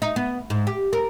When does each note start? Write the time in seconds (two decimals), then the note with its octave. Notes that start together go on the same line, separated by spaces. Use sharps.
0.02 D#4
0.16 B3
0.50 G#2
0.67 G4
0.93 A#4